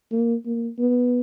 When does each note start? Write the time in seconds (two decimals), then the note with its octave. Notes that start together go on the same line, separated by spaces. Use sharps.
0.12 A#3
0.46 A#3
0.79 B3